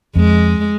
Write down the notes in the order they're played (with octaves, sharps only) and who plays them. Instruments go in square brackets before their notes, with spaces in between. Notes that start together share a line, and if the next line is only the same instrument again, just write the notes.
[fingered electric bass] F2 [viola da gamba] G#3